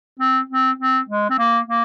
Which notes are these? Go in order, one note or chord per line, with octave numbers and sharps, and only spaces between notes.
C4
C4
C4
G#3
C4
A#3
A#3